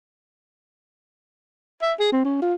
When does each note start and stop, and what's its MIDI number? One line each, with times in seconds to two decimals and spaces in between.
1.82 1.93 76
1.99 2.09 68
2.12 2.23 60
2.25 2.42 61
2.42 2.54 65